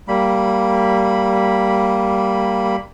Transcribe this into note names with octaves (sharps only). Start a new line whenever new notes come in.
G3 A#3 B5